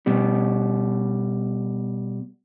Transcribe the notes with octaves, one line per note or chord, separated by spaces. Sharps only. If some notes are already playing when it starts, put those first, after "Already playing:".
B2 G3